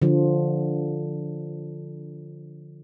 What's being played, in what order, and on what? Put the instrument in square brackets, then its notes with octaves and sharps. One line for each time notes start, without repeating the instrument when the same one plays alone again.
[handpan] D3 F3